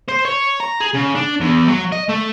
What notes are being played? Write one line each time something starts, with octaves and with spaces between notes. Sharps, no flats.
C5
C#5
A#5
G#4
C#3
D4
E2
F#3
D#5
A3